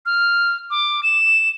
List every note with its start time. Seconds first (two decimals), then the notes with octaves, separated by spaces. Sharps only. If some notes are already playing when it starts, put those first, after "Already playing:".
0.06 F6
0.71 D6
1.03 E7